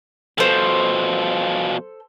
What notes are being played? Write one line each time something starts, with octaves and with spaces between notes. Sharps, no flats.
B2 F3 A4 C5